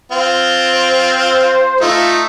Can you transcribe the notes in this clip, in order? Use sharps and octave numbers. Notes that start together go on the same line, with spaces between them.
C4 F4
C5
A3 D#4 F4